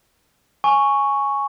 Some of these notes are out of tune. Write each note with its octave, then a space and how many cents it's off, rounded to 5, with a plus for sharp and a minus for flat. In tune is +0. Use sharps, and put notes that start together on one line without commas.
G#5 +0 C#6 +0